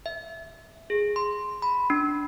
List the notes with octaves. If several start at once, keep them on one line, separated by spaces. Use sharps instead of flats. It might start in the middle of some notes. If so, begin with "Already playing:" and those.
E5
G#4
C6
B5
D4